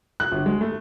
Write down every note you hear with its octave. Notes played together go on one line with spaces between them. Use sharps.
F#6
G1
G#3
A3